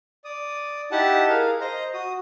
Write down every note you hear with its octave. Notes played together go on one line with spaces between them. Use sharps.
D5 D#6
D#4 E4 G4 F#5 A5
G#4 A#4 F5
C5 D#5 A#5
F#4 D#6